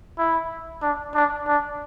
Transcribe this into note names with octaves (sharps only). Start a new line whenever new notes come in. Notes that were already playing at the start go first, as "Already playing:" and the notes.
E4
D4
D4
D4